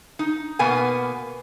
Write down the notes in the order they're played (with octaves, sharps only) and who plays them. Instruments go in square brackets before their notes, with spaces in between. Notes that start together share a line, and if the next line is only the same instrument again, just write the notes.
[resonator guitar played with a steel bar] D#4
B2 A#3 B3 G#5